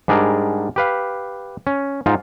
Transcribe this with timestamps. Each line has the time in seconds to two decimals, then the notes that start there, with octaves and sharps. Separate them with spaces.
0.08 G#2 G3 D4 G#4 A#4
0.76 G4 B4 F5
1.67 C#4
2.06 G#2 D#4 F4